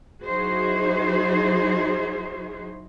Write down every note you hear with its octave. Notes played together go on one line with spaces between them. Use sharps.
F#3 D#4 E4 F#4 G#4 C5